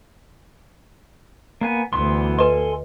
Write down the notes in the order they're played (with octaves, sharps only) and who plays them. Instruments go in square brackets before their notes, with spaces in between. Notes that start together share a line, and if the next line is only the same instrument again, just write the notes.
[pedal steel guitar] A#3 B3 G#5
[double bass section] D2 [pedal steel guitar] E3 B3 C6
[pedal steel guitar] A4 G#5 C6 [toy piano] B4 D#5